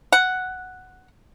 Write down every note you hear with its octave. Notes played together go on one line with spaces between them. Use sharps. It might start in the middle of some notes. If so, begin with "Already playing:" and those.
F#5